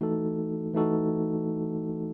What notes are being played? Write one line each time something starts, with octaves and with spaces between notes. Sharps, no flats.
E3 A3 D#4 F#4 A4
E3 A3 D#4 F#4 A4